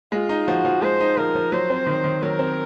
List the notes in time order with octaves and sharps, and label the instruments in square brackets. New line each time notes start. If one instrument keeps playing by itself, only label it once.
[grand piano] G#3 [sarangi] F4
[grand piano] D#4
[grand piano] F3 [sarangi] F#4
[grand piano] F3
[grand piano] G#3 [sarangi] C5
[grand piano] D#4
[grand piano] F3 [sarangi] A#4
[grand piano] F3
[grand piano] F#3 [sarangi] C5
[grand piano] C4
D#3
D#3
[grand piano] F#3 [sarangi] A#4
[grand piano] C4